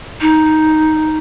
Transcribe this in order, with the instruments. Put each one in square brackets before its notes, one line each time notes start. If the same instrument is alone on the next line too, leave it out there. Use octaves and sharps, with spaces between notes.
[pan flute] D#4